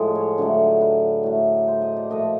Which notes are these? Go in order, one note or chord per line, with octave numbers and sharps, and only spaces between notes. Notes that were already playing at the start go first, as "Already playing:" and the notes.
Already playing: A2 F3 G#3
C#5
D3 F#3 A3
B4
A2 F#3 A3
C5
D#5
D5
A#2 F3 A3 D#5